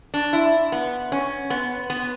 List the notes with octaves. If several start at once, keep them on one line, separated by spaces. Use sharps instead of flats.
D4
E4
B3
C#4
B3
B3